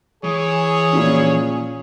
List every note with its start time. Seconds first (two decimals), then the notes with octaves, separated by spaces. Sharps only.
0.24 E3 G#4 C#5
0.93 A#2 F3 C#4